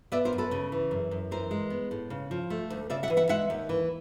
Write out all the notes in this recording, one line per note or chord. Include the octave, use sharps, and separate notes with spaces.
B3 D5 E5
A#4 C5
F#2
A4 B4
C#3
E3
F#2
F#2
E3 A#4 C5
G#3
B3
A2
C#3
F3
A3
D2
C#3 D5 E5
E5 F#5
E3
E5 F#5
G#3 E5 F#5
D#2
E3